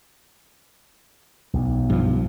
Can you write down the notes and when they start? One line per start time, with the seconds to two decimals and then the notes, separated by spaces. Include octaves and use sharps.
1.53 B1
1.90 G2 F3